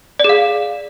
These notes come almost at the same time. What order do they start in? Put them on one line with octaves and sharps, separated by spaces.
D5 G#4 F5